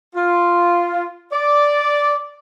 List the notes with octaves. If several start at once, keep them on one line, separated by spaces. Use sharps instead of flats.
F4
D5